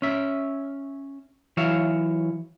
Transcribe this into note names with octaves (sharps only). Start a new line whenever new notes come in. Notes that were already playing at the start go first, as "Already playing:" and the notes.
C#4 E5
E3 F#3 C#5 E5 F5